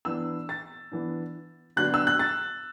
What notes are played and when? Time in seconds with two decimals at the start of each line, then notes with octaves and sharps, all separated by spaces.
0.05 E3 B3 D4 E6
0.49 A6
0.91 E3 B3 D4
1.76 D3 F#3 B3 D4 F#6
1.94 E6
2.07 F#6
2.19 A6